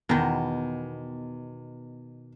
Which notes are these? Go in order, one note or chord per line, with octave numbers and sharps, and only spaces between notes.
E2 B2 D#3